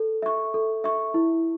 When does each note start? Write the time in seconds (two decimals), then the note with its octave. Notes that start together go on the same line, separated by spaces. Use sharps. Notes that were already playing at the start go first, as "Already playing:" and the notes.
Already playing: A4
0.22 E5 C#6
0.54 A4
0.84 E5 C#6
1.14 E4